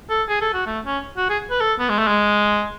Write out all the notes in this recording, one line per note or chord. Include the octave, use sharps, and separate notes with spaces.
A4
G#4
A4
F#4
A3
C#4
F#4
G#4
B4
A4
B3
G#3
A3
G#3